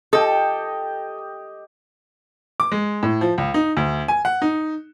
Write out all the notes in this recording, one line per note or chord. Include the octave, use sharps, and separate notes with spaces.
G4 A4 D#5
D6
G#3
A2
F3
C#2
D#4
D2
G#5
F#5
D#4